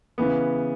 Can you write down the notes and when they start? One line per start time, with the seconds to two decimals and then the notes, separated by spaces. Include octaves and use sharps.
0.18 C#3 E3 B3